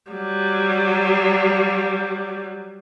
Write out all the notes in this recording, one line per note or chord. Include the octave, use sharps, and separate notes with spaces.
F#3 G3